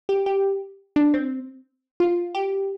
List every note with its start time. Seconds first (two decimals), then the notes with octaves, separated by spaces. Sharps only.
0.09 G4
0.26 G4
0.96 D4
1.14 C4
2.00 F4
2.35 G4